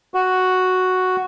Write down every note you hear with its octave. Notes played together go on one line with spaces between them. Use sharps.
F#4